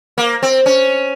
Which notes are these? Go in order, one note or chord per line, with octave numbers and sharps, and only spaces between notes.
A#3
C4
C#4